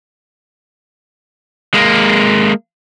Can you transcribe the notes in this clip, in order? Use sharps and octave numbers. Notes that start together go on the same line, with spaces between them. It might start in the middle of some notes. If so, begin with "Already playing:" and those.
G#3 A#3